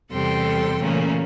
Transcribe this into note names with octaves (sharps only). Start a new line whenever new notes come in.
E2 C3 G3 A4 G5 C6
A#2 C#3 E3 A3 A#3 C#4